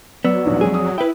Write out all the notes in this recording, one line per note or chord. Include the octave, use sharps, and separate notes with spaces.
F#3 B3 D5 E6
A#1 D#2
F2 G#3 G#4
D#6
E4 B4 G5